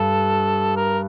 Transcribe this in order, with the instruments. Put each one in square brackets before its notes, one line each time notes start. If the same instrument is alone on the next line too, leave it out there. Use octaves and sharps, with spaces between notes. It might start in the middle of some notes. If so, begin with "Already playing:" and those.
Already playing: [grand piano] G2 [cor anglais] A4
[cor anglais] A#4